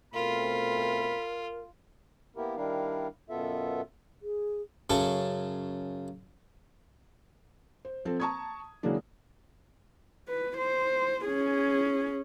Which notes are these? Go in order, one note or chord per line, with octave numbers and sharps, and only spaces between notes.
B2 A3 C4 F4 A#4 B5
A#3 B3 E4 G4 A#4
D#3 G3 D4 E4 A#4 F5
F#2 B2 B3 F4 A4 E5
G#4
F#2 C#3 A4 C#6
C5
F3 C4 A4 C5
A5 A#5 C#6 D#6 G#6
C#3 E3 F#3 G#3 A#3 D4
B4
C5
C#4 G#4